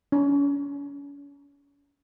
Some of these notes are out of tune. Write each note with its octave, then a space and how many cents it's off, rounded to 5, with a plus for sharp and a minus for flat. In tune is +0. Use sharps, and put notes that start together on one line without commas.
C#4 +40